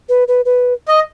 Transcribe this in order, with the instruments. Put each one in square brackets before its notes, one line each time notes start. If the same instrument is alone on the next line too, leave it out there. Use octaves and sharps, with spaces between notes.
[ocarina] B4
B4
B4
[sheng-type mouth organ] D#5